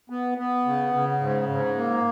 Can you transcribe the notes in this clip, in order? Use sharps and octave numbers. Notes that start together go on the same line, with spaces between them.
B3
B3
C#3
C#3
G#2
G#2
A#3